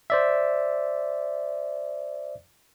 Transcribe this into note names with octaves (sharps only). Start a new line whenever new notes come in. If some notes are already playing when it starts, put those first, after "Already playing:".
C5 D5 E5